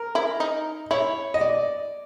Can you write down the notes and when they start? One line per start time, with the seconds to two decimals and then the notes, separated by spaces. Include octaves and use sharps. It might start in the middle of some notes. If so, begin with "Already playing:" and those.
Already playing: A#4
0.15 E4
0.40 D#4
0.91 E4 C#5
1.34 D#5
1.41 D5